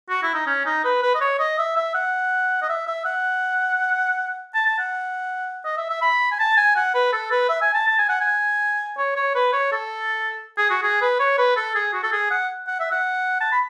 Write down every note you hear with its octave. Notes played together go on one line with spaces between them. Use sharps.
F#4
E4
D#4
C#4
D#4
B4
B4
D#5
C#5
D#5
E5
E5
F#5
D#5
E5
E5
F#5
A5
A5
F#5
D#5
E5
E5
B5
G#5
A5
G#5
F#5
B4
A4
B4
E5
G#5
A5
A5
G#5
F#5
G#5
C#5
C#5
B4
C#5
A4
G#4
F#4
G#4
B4
C#5
B4
A4
G#4
F#4
A4
G#4
F#5
F#5
E5
F#5
A5
B5